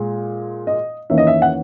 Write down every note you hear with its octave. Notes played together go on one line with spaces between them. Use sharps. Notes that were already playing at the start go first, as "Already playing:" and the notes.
Already playing: A#2 G#3
D#5
E2 D#3 A#3 C#4 E5
D#5
E5
F#5